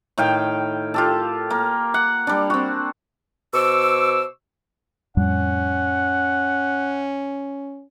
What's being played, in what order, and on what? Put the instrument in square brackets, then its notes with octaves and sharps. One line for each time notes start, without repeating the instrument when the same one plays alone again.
[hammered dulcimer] A2 D#3 F5 G5
F4 G4 A4
A#3
F#5
G3 D4
C4 F#4
[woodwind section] B2 C5 C#6 D6 E6
[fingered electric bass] F2 A2 G3 [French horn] C#4 [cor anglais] F#5